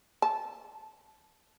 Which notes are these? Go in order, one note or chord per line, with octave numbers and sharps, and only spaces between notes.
A5